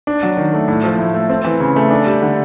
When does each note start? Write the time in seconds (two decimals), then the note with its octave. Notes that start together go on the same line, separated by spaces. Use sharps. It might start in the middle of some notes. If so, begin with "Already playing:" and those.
0.07 D4
0.23 F#3
0.37 D#3
0.54 A3
0.68 A2
0.84 F3
0.99 A2
1.14 A3
1.30 C4
1.44 E3
1.60 C#3
1.76 A3
1.90 D4
2.06 G3
2.22 D3